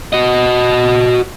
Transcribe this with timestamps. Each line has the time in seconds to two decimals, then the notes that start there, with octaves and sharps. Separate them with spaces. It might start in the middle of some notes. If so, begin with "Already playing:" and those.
0.13 F#4 D#5